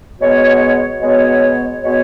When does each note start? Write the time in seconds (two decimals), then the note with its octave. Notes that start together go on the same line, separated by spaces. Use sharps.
0.19 B2 G#3 B3 F#4 C#5
1.01 B2 G#3 B3 F#4 C#5
1.83 B2 G#3 B3 F#4 C#5